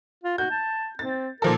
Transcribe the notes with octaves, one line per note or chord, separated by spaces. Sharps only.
F4
F#4 G6
A5
C4 A6
A#2 F3 A4 A#4